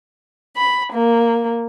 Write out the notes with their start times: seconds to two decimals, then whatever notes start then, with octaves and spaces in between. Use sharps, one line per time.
0.56 B5
0.92 A#3